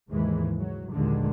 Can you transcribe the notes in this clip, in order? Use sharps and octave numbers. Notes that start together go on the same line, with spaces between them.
D#2 G#2 C#3 E3 G#3
F#3
A#1 D#2 A#2 D3 G#3